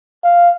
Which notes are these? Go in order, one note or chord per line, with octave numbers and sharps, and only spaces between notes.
F5